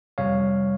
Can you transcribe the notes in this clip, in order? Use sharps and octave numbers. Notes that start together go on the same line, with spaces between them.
F2 C3 G3 C#5 F5